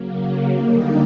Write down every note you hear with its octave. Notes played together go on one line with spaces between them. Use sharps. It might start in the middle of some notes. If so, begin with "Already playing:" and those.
Already playing: C#3 F#3 A#3
D3 G3 A#3 D#4